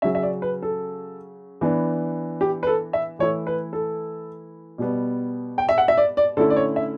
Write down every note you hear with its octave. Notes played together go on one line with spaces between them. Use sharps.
C#3 F#3 C#4 E5
E5
D5
B4
A4
E3 B3 D4
G4
B4
A4
E5
E3 A3 E4 C#5
B4
A4
B2 G3 B3
G5
E5
F#5
E5
D5
D5
D3 A3 C#4 E4 A4
D5
C#5
E5